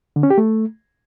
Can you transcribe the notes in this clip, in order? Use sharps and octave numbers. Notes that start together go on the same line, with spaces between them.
D3
C#4
G4
A3